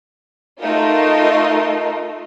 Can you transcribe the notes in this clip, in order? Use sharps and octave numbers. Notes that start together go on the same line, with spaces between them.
A3 D#4 F4 A#4 D#5